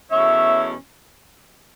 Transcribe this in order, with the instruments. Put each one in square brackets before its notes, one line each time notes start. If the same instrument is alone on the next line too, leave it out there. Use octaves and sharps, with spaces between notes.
[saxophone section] E2 B2 A3 C#4 C#5 E5